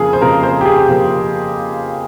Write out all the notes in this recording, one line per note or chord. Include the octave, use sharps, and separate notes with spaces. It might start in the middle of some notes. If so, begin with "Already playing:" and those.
Already playing: F2 C#3 F3 A#3 G#4
C5
F2 C#3 F3 A#3 A#4
C5
G4
G#4
C#3 F3 A#3